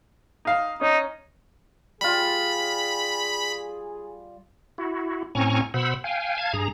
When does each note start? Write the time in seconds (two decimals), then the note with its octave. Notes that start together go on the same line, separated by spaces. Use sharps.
0.45 D#4 F5
0.81 C#4 D#4
2.01 G3 F4 G#4 B5
4.78 E4 F#4
5.35 A2 C4 C#4 G#5 A#5 C#6
5.74 B2 C5 F#5 B5 E6
6.04 F5 G5 G#5
6.38 F5 A5 G#6
6.53 G2 G#4 A#5